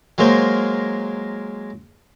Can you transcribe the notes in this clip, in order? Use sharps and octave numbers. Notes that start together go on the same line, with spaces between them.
F#3 G#3 A#3 A#4 C5